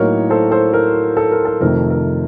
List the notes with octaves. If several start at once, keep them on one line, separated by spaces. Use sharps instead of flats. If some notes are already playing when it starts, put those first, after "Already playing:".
Already playing: A2 F#3 A#3 D#4 A#4 C#5
A4 C5
A4 C5
A#4
A4
A#4
A4
F2 C3 D#3 A3 A#4
A#4